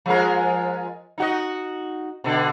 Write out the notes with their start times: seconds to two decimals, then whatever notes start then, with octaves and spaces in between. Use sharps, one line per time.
0.06 F3 G#3 A#4
1.18 D#4 F#4 D#5
2.24 B2 D3